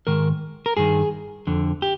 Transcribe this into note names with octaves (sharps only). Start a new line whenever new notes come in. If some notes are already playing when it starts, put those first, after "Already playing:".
G#2 D#3 A#4
A#4
G2 D#3 G#4
F2 D3
G4